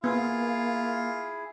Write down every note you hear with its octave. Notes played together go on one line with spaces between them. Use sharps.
A#3 B3 E4 F4 G#4